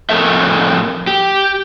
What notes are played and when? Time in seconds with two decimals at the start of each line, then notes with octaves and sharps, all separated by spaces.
0.09 F2 A2 E3 A4 A#4 E5
1.07 G4